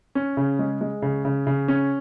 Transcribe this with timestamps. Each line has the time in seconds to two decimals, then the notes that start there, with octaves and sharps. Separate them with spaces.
0.15 C#4
0.37 C#3
0.59 G#3
0.81 G#3
1.02 C#3
1.25 C#3
1.47 C#3
1.68 C#4